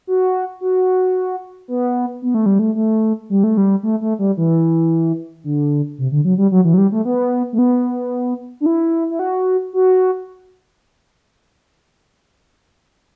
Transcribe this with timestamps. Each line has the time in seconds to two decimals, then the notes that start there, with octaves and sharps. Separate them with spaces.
0.07 F#4
0.61 F#4
1.68 B3
2.22 B3
2.34 A3
2.46 G3
2.59 A3
2.75 A3
3.30 G3
3.44 A3
3.57 G3
3.83 A3
4.01 A3
4.19 G3
4.37 E3
5.44 D3
5.98 C3
6.12 D3
6.25 F#3
6.38 G3
6.51 F#3
6.65 E3
6.74 F#3
6.78 G3
6.92 A3
7.05 B3
7.53 A3
7.59 B3
8.61 D4
8.66 E4
9.10 E4
9.19 F#4
9.73 F#4